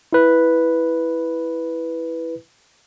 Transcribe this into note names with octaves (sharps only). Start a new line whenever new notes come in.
E4 B4